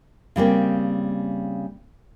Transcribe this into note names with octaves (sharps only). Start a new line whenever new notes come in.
C#3 G3 A#3 C4